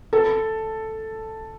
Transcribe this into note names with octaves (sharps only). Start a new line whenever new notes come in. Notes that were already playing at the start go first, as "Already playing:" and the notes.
A4